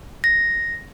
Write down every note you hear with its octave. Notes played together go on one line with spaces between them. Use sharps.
A#6